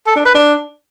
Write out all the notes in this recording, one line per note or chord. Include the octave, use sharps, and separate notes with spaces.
A4
D4
B4
D4